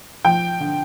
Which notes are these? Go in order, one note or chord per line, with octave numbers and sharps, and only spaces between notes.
F3 G5
D3